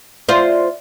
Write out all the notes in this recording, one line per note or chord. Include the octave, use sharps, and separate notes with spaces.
F4 C5 D5 E5